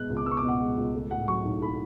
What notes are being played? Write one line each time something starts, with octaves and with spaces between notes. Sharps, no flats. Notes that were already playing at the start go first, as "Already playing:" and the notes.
Already playing: B2 G#3 B3 F#6
C#2
D6
B3 E6
C#6
D6
B2 F#5
G#3
C#2
A3
A2 F#5
F#3 C#6
B1
A3 B5